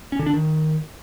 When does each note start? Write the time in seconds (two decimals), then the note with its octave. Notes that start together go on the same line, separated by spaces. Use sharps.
0.12 C#4
0.19 D3
0.26 D4
0.34 D#3